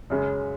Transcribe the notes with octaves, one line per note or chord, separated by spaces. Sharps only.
F#2 C#3 G#3